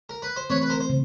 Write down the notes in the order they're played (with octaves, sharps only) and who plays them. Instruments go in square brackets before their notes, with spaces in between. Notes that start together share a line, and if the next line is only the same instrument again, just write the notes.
[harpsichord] A#4
B4
C5
[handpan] E3 A3 C4 [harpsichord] B4 C#5
[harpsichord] B4
A#4 C5
C5
[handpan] C#3